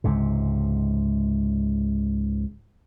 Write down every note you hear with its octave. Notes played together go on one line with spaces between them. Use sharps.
C#2 G#2 C3